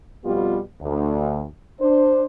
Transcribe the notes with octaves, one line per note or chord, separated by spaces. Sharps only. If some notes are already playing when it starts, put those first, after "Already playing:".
F2 B2 G3 B3 F4 G4
D2
D4 C5